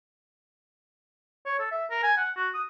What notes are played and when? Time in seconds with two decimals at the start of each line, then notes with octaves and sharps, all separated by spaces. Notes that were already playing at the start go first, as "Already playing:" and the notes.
1.46 C#5
1.59 A4
1.72 E5
1.90 A#4
2.03 G#5
2.17 F#5
2.36 F#4
2.54 D#6